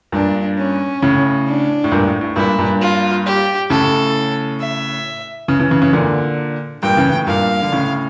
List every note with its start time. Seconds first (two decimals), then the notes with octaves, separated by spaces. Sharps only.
0.12 G2 A#2 D4
0.57 C#4
1.02 A2 C#3
1.47 D4
1.84 A2
1.92 G2 A#2
2.06 A2
2.21 A2
2.36 G2 A#2 E4
2.58 G2 A#2
2.81 F4
3.26 G4
3.70 A2 C#3 A4
4.60 E5
5.48 C#3 E3
5.59 C#3 E3
5.71 C#3 E3
5.82 C#3 E3
5.93 A#2 D3
6.82 G2 A#2 G5
6.97 C#3 E3
7.13 A2
7.27 G2 A#2 F5
7.62 D3
7.72 A2 C#3